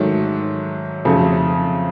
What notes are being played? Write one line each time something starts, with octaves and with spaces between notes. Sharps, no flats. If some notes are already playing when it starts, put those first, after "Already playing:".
Already playing: G#2 D#3 F#3 A3
F2 C#3 F#3 A3 C4